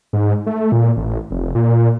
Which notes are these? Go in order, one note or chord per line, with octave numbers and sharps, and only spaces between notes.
G#2
A3
A#2
A1
F1
A#2